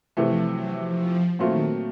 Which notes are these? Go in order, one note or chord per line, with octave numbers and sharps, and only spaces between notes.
C3 E3 F3 A3
F#3
F3
A#2 D#3 F#3 A3 C4 F4